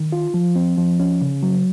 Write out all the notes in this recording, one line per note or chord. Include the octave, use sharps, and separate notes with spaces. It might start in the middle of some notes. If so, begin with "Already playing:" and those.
Already playing: D#3
F4
F3
C4
F3
C#4
C#3
F#3